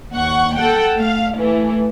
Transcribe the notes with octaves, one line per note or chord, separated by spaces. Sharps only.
D#2 F#5 C#6
A4 F#5 G5
A3 F5
E3 A3